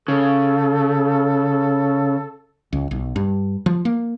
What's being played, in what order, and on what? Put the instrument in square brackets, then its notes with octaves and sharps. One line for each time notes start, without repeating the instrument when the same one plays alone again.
[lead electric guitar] C#3 [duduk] A4
[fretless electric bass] C#2
B1
G2
F3
A#3